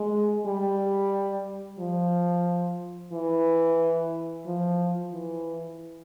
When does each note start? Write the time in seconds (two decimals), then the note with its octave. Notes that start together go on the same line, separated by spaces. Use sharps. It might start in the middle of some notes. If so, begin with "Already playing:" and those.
Already playing: G#3
0.46 G3
1.79 F3
3.13 E3
4.46 F3
5.13 E3